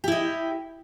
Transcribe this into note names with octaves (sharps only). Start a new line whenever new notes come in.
E4 G4 D#5